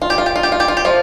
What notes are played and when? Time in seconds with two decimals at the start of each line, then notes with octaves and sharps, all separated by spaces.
0.02 F4
0.10 G4
0.18 F4
0.26 G4
0.36 F4
0.43 G4
0.52 F4
0.60 G4
0.68 F4
0.77 G4
0.85 F3 F4